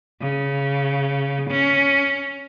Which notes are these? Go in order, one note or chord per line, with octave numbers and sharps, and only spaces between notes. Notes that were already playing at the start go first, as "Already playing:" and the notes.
C#3
C#4